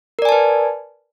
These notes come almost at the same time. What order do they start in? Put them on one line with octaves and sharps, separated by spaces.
A#4 D5 G#5 A5 B4